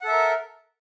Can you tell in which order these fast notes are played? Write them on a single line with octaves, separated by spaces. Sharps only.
F#5 A4 E5 A#4